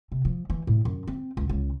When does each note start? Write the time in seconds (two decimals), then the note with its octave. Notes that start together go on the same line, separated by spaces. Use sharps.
0.12 C3
0.25 F3
0.50 E3
0.67 A2
0.85 F#2
1.07 C4
1.37 C#2
1.49 C#2